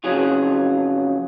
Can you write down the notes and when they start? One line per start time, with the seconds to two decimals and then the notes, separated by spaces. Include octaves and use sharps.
0.04 F2 C#3 F#3 F4 G#4